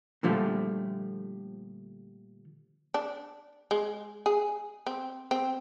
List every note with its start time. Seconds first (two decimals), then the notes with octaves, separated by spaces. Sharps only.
0.23 A#2 D3 F3 G3 A3
2.94 D4
3.71 G#3
4.26 G#4
4.86 C4
5.31 C4